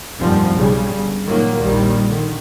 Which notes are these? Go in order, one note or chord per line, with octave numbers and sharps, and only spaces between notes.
F1 G2 A#2 F3 G3 C4
B1 C#3 G3
G1
A#2 D#3 F#3 A#3
A#1 D#2 D#3 G3
D3 D#3